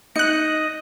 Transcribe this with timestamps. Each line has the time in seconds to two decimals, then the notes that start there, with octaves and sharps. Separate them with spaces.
0.16 D#4 D#5 F#6 C#7